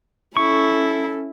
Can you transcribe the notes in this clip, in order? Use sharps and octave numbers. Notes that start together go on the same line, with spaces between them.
C#4 E4 A4 C#6